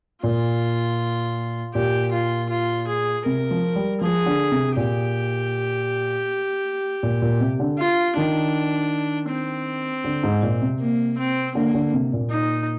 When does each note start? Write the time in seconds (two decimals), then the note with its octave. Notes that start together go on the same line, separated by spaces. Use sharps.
0.23 A#2 F4
1.74 A#2 G4
2.12 F4
2.50 F4
2.88 G#4
3.26 C3 A#4
3.51 F3
3.76 G3
4.01 F3 G#4
4.26 D3
4.52 C3
4.76 A#2 G4
7.03 A#2
7.22 A#2
7.40 C3
7.60 D3
7.79 F4
8.16 D#3 D4
9.30 C4
10.04 D3
10.23 G#2
10.43 A#2
10.62 C3
10.81 A#3
11.18 C4
11.55 D3 A#3
11.74 D3
11.93 C3
12.13 A#2
12.31 D#4